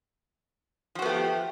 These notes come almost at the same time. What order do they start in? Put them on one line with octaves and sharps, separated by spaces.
F3 F#4 B3 A3 G4